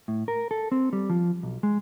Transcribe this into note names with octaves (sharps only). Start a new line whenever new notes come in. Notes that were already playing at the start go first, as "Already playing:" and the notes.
A2
A#4
A4
C4
G3
F3
B1
G#3